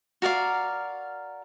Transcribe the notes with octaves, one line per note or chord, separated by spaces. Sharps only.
F#4 A#4 D5 F5